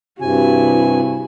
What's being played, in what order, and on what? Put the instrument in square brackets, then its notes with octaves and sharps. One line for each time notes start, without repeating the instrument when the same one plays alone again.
[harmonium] G2 G#5 [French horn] C3 [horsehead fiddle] E4 F#4